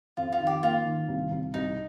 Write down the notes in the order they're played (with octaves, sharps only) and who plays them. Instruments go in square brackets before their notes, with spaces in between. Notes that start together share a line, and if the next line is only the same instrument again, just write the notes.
[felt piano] F2 [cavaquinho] F4
[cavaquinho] F4
[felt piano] D#3
[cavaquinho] G4
[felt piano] A#3 [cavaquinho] F4
[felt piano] D#3
C2
C2
[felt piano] C2 [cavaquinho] D#4